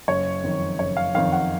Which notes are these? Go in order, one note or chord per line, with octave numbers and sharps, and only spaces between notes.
F#1 C#5
F2 D#3
F#1 C#5
F5
F2 D#3 F5
F#5